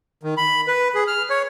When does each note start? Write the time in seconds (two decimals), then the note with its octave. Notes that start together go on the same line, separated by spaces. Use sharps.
0.23 D#3
0.37 B5
0.68 B4
0.95 G#4
1.07 F6
1.30 C#5